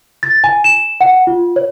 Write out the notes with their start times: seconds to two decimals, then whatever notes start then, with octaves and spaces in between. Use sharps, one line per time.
0.23 A6
0.44 G#5
0.64 E7
1.01 F#5
1.27 F4
1.56 C#5